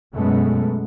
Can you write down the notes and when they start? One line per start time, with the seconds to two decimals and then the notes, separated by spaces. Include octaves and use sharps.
0.13 F#2 B2 G#3 A3 B3